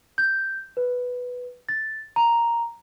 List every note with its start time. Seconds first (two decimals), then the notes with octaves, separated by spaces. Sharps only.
0.18 G6
0.77 B4
1.69 A6
2.16 A#5